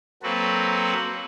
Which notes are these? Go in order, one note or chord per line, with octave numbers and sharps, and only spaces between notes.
F#3 A#3 C4 F#4 A4 B4